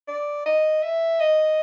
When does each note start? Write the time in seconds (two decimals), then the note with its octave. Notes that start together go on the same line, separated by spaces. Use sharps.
0.08 D5
0.46 D#5
0.83 E5
1.20 D#5